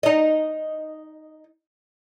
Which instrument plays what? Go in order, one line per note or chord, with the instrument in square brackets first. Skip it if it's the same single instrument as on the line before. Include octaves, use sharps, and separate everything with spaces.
[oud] D#4 D#5